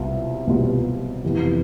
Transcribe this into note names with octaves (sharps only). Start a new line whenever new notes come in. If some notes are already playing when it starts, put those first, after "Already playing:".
Already playing: C2 B2 G3 B3 F4
C2 B2 G3 B3 F4
F2 C3 E3 B3 E4